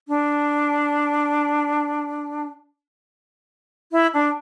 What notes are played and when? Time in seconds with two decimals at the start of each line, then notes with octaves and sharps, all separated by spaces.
0.08 D4
3.92 E4
4.14 D4